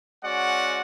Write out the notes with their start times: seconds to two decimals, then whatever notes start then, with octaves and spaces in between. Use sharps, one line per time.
0.24 G#3 C#4 F#4 D5 F#5